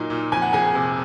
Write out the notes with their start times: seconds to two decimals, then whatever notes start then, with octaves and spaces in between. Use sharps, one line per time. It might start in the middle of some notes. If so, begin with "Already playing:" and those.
Already playing: A#2 F#3 D#4 A#4
0.10 A#2
0.32 F2 G#5
0.42 F#5
0.53 F2 G#4 G#5
0.75 C3